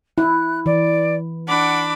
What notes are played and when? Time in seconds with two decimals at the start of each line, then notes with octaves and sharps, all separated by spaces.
0.18 E4 F#6
0.66 E3 D5
1.47 D4 F#5 B5 D6